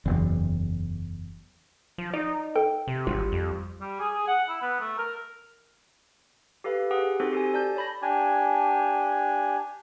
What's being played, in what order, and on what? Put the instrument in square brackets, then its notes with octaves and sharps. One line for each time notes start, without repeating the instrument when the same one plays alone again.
[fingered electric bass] F#1 E2
[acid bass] F3
[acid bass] D#4 [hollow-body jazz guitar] D5
[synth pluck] A4 [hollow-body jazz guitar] G5
[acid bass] C3
[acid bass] G#1 [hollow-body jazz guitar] G3 F4 F#4
[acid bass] F2
[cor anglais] G3
G#4
G#4
F#5
E4
B3
A3
A#4
[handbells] G4 A4 B4 F5
G4 G#4 F#5
C4 D#4 F#4 A4 C5
G4 A4 G#5
D5 A5 G6
C#5 B5 A#6
[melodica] D4 G4 G#5